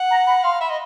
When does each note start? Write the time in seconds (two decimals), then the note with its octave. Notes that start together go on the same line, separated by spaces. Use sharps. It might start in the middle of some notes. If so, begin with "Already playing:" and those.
Already playing: F#5
0.10 A#5
0.27 B5
0.44 F5 C6
0.61 E5 B5
0.70 D#5